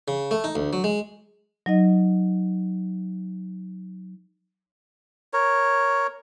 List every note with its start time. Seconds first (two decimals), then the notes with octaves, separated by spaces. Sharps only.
0.08 C#3
0.31 A3
0.44 D#4
0.55 D2
0.73 F#3
0.84 G#3
1.66 F#3 D#4 D#5
5.33 A#4 C#5